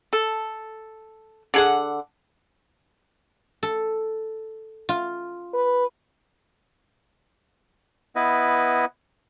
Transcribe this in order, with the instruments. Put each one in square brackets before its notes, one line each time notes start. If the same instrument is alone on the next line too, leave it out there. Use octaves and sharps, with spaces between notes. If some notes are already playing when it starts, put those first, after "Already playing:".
[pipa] A4
D3 G#4 F#5
[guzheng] A4
F4
[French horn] B4
[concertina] B3 E4 B4 D#5